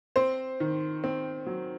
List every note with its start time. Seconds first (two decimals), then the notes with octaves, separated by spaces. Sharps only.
0.16 C4 C5
0.60 D#3
1.04 C4
1.46 F#3